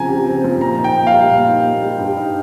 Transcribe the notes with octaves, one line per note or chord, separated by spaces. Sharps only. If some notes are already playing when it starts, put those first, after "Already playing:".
Already playing: C#3 F3 C4 G#5 A#5
G4
C4
F3
A#2 A#5
D#4
G5
A#3
F5
G3
A#2
D#4
A#3
G3
G2
D#4